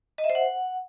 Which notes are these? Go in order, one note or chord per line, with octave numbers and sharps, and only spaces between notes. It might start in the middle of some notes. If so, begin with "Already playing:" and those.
D#5
E5
C5
F#5